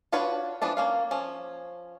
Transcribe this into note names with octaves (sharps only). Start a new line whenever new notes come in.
D4 F4 F#4 B4 C#5
E3 F3 B3 D4
A#3 C#4 F5
F3 C#4